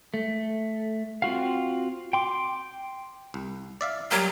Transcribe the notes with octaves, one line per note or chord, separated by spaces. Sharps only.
A3
C4 F4 F#4 F5
G5 C6 D6
C2
D5 E5 F5
F#3 G3 A#3 F5